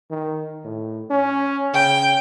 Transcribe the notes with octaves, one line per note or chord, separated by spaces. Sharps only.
D#3
A2
C#4
C#3 G5